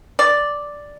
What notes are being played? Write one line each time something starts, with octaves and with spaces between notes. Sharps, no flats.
D5